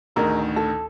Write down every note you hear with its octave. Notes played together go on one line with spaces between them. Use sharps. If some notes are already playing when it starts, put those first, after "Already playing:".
A1 D2 D#3 D#4 G#4 A#4
A4